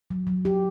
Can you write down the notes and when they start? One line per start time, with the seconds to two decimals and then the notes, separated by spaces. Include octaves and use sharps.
0.10 F#3
0.27 F#3
0.45 G4